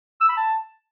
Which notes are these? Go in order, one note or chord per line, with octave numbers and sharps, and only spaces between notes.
E6
B5
A5